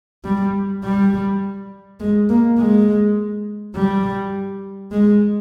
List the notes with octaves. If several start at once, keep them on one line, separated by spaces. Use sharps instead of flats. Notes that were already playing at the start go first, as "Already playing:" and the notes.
G3
G3
G#3
A#3
G#3
G3
G#3